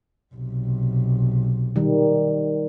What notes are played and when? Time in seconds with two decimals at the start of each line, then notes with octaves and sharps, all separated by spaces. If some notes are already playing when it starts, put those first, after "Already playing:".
0.35 B1 C3
1.76 D#3 G3